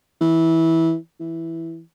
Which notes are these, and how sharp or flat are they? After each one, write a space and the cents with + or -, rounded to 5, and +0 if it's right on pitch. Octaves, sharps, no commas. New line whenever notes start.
E3 -15
E3 +0